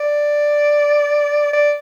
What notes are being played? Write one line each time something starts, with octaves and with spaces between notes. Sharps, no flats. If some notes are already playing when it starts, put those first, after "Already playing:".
Already playing: D5
D5